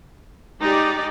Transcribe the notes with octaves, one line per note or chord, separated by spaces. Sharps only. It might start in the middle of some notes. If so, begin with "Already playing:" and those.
G#3 D#4 G4 D5